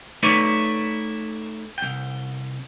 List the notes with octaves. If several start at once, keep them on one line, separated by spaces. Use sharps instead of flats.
A3 D#4 E4 B4 C#5 D5
C2 G5